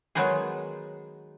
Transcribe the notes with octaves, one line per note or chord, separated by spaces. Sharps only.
D#3 F#3 G#3 B3 D#4 G#4